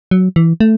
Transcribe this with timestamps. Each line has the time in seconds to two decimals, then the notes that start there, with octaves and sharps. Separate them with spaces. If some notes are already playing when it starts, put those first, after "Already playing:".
0.11 F#3
0.36 E3
0.60 A3